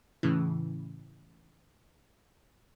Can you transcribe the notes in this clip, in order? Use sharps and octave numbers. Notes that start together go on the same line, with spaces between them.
A2 C#3 E3